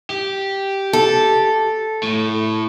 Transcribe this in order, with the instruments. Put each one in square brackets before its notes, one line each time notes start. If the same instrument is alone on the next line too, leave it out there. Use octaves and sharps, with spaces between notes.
[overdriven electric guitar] G4
[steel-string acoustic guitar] A4
[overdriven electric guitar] A2